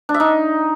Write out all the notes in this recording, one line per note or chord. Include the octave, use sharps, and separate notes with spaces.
D4
E5
D#4